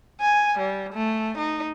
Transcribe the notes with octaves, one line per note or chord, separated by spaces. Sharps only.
G#5
G3
A3
D#4